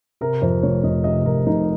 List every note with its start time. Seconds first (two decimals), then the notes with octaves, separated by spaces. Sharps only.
0.21 C3 A#4
0.42 F2 C5
0.63 F1 C#5
0.84 F1 D#5
1.04 C3 D#5
1.25 F2 A#4
1.47 F1 D#4